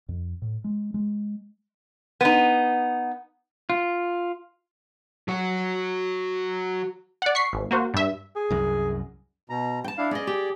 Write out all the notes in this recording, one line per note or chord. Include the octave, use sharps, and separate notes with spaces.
F2
A2
G#3
G#3
B3 D#4
F4
F#3 F#4
D5 F#5
C#6 B6 C7
G#1
A#3 F#4 C5
G2 E5
G#4
C2 F#2
B2 A#5
G5 A5
D4 E4 F5
C#4 G#4 D5 D#5
G4